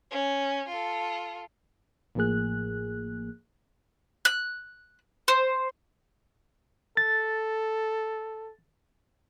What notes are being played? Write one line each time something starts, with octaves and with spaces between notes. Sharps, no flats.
C#4
F4 A4
A1 A2 F3 A#3 G#4 F#6
F#6
C5
A4 A6